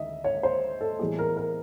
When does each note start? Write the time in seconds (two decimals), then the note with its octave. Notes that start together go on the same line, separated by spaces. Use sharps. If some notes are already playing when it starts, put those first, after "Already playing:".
Already playing: D2 D#3 D#5 E5
0.24 C#5
0.43 C5
0.81 A4
0.99 A2 E3 G3 B3 G#4
1.19 A#4
1.37 A#4